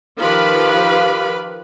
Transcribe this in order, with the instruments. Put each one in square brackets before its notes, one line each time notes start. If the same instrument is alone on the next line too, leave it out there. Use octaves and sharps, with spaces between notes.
[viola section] D#3 F3 G4 B4 F5 B5